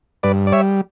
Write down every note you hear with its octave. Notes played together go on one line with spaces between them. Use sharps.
G2 B4 D5
D5
G3 C#5 E5